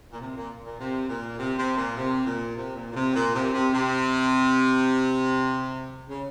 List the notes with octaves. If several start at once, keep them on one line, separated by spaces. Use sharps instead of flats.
A#2
C3
A#2
A#2
C3
A#2
C3
C3
A#2
C3
A#2
C3
A#2
A#2
C3
A#2
C3
C3
C3
C#3